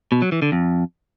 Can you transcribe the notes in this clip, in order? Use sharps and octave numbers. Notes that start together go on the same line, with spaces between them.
B2
F#3
E3
D3
F2